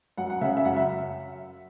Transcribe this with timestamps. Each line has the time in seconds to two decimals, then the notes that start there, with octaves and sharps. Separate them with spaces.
0.18 F#2 F#5
0.30 F#5
0.41 C#3 E5
0.57 E5
0.65 F#2 F#5
0.77 E5